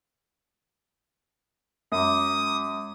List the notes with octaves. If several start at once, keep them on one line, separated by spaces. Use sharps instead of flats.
F#2 G#3 A#5 D6 D#6